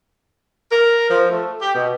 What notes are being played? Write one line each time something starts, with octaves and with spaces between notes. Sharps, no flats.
A#4
F3
A3
G4
B2